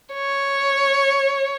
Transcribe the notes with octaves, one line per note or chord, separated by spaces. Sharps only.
C#5